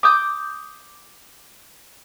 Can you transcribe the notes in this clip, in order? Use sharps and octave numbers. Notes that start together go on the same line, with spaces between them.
D6 D#6 G6